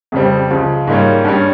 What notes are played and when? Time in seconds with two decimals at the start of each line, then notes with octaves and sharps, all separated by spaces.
0.12 F2 C#3 G3 C4
0.51 C#2 C#3 F3
0.87 G#2 G3 A#3 C#4
1.25 G2 G3 C#4